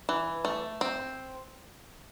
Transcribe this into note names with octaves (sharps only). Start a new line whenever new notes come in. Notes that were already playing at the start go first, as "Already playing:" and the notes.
E3
A3
C4